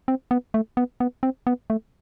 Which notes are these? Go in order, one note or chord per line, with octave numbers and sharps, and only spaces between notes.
C4
B3
A3
B3
B3
C4
B3
A3